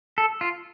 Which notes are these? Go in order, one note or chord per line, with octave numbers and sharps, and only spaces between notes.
A4
F4